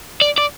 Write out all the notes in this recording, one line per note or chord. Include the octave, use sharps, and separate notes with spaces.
D5
D5